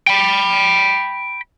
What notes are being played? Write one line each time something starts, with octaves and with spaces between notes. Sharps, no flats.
G5 B5